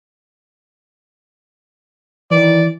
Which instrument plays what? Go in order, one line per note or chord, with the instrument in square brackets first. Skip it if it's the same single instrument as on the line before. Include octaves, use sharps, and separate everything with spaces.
[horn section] D#3 D5 [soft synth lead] E3